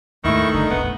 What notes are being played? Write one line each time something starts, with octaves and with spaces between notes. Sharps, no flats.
D#2 G#2 D#3 A3 E4 C#6
G1 D3 D#4
E1 A#1 B3